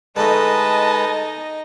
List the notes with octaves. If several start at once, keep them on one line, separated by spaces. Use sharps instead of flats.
D3 G#3 A3 D#4 B4 D#5 A5